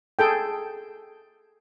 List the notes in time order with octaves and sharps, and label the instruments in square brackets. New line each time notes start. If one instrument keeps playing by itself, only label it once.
[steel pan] G#4 A4 G5